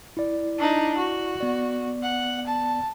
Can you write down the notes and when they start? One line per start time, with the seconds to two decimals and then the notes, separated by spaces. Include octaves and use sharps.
0.17 E4 D5
0.59 D4 D#4
0.98 F#4
1.41 B3 D5
2.03 F#5
2.47 A5